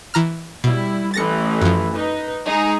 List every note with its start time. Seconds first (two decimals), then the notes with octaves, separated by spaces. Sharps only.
0.14 E3 A#5 F6
0.64 B2 G3 E4
1.14 A1 E3 A6 A#6 C#7
1.61 F#2 F3
1.94 D#4 B4
2.46 G#3 D#4 G#4